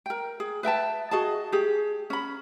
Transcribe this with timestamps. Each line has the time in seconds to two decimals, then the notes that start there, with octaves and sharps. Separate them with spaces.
0.06 A#4 G5
0.40 G#4
0.63 B4 E5 G5 A5
1.11 F#4 G#4 D#5 A5
1.52 G4 G#4
2.10 C#4 B5